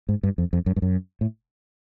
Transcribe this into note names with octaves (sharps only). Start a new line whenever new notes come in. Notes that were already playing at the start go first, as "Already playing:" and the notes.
G#2
G2
F2
F2
F#2
G2
F#2
A2